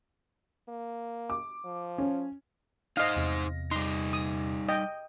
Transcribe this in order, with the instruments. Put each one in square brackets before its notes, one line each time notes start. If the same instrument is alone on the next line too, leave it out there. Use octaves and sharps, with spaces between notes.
[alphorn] A#3
[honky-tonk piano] D6
[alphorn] F3
[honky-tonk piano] C#4
[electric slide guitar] D#4 C5 [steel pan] D#5 F5
[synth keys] E2 C3 A#6
[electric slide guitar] G3 D#4 [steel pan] C6
[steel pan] D#6
D#5 G5